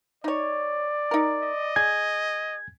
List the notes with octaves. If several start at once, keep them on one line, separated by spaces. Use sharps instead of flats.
D#4 C#5 D5
D#4 A#4
D#5
G#4 G#6